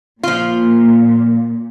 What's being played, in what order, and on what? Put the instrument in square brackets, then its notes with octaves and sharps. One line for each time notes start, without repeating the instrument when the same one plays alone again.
[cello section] A#2 [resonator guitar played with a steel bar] F3 F4